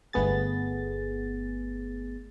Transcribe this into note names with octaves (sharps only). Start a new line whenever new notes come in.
G1 A3 B3 G#4 A6